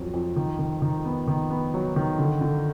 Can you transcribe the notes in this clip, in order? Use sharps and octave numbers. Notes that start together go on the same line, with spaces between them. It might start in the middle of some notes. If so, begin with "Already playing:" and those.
Already playing: F2 F#3
F2
D#3
D#3
D#3
B3
D#3
B3
F#3
D#3
D3
D3